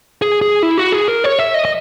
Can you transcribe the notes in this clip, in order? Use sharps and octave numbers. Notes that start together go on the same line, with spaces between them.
G#4
G#4
E4
F#4
G#4
A#4
C#5
E5
D#5
D#5